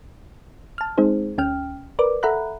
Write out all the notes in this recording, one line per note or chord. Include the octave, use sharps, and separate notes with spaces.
A5 F6
G#3 C4 D#4 G#4 C5
D2 C#4 G5 F6
A#4 B4 D5 D6
A4 E5 F#5 A#5 B5 F#6